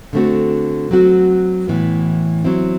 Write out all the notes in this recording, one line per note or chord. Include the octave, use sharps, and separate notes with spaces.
D3 A3 C4 F#4
F#3 C4 F#4
A2 E3 B3
F#3 C4 E4